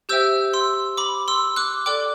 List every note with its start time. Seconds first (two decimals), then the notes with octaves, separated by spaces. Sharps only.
0.09 G4 C5 E5 G5 E6 G6
0.53 C6 E6
0.97 B5 D6
1.28 C6 E6
1.56 D6 F#6
1.86 A4 D5 G5 D6 F#6